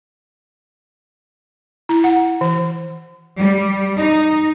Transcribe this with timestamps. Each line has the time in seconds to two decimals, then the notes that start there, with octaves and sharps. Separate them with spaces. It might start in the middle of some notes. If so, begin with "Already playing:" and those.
1.89 E4
2.04 F#5
2.41 E3
3.37 G3
3.98 D#4